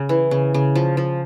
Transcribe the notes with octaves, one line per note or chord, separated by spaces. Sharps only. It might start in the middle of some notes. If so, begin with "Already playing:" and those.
Already playing: C#3
E3
C#3
C#3
F3
F3